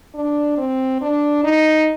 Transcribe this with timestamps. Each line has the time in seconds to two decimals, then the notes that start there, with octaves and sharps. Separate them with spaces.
0.15 D4
0.58 C4
1.02 D4
1.44 D#4